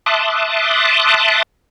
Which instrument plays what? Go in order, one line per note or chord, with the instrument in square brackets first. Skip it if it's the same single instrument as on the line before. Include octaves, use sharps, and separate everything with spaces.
[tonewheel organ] E5 A5 C6 D6 D#6 F#6